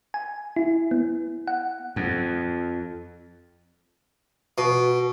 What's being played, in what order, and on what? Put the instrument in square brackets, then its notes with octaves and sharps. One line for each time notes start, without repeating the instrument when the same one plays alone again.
[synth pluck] G#5
E4
B3
F#5
[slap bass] F2
[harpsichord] B2